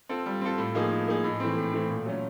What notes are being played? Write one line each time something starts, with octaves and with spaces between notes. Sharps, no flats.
C4 F4 A4
G3
C4 F4 A4
A2
F3 A#3 D#4 G#4
A2
F3 A#3 D#4 G#4
A2
E3 A3 C4
A2
E3 A3 C4
A#2
F#3 A3 C#4